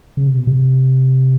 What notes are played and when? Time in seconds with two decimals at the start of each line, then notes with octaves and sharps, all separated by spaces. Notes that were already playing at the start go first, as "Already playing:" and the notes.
0.17 C#3
0.27 C3
0.37 B2
0.47 C3